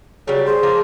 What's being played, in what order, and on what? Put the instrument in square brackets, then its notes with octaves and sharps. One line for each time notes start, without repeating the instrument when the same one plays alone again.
[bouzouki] C#3 G3 [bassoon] F#3
[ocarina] G#4 [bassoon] C5
[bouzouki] F3 A#3 D4